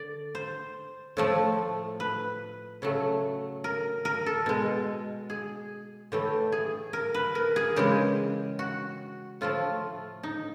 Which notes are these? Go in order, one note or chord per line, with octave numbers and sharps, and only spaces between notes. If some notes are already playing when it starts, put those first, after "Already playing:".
Already playing: D3 D5
C5
A2 F3 A3
B4
C#3 F#3 A3
A#4
A#4
A4
B2 G#3
G#4
A2 E3 A3 G4
G#4
A#4
B4
A#4
G#4
C#3 E3 G#3 G4
F#4
A2 F3 A3 F4
D#4